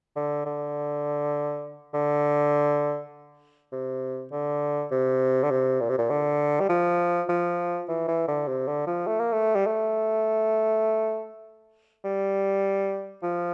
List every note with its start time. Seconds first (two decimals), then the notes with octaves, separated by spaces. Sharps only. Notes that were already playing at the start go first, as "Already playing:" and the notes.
0.16 D3
0.46 D3
1.94 D3
3.72 C3
4.32 D3
4.91 C3
5.44 D3
5.51 C3
5.81 A#2
5.89 C3
5.98 A#2
6.10 D3
6.60 G3
6.69 F3
7.29 F3
7.88 E3
8.08 E3
8.28 D3
8.48 C3
8.68 D3
8.87 F3
9.07 A3
9.20 A#3
9.33 A3
9.56 G3
9.66 A3
12.04 G3
13.23 F3